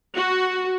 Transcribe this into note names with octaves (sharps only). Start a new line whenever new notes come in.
F#4